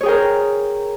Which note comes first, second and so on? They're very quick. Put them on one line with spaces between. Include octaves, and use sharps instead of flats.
C#5 G#4 G5 A#4